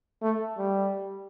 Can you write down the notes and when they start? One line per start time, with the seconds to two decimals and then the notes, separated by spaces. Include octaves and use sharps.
0.22 A3
0.58 G3